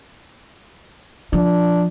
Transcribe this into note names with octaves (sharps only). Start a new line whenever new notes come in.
F3 D4